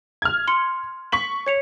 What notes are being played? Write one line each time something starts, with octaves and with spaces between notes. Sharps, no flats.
F6 G#6
C6 C#7
C#6 B6 F#7
C#5 C#7 F7